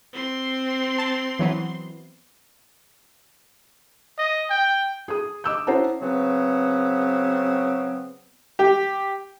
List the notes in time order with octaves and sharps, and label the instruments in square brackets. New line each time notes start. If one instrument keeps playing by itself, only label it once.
[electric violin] C4 C6
[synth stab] A5
E3 F#3 B3
[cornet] D#5
G5
[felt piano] G#4 D#6
D#5 D6 E6 G6
C#4 E4 C5 F#5 A5 A#5
[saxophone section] C#3 F#3 B3 C4
[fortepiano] G4